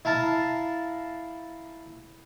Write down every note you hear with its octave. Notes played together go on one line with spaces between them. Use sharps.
E4 F5 A5 A#5